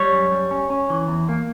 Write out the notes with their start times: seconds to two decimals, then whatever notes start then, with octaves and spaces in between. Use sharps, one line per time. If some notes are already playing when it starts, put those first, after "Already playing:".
Already playing: G3 C#5
0.12 F#2
0.31 G3
0.51 C#4
0.70 C#4
0.90 E3
1.08 E2
1.29 A#3